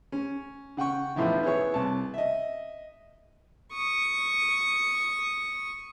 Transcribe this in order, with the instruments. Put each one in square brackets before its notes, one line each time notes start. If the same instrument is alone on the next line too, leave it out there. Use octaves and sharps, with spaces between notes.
[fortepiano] C#4
C#3 F#5 G5 C#6
E2 A2 E3 F3 D#4 E4
B3 E4 G#4 C#5 C#6
C2 A5
D#5 E5
[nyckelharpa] C#6 D#6